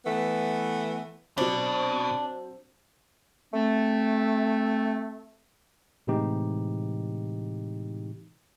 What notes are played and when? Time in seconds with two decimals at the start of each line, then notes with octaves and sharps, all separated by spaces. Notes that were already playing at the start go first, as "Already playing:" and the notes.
0.05 E3 A3 B3
1.38 B2 F#3 C4 D4 C5
3.54 A3 C4
6.07 A2 C3 E3 G#3 D#4 G4